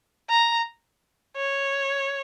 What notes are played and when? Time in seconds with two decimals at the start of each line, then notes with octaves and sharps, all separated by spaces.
0.30 A#5
1.37 C#5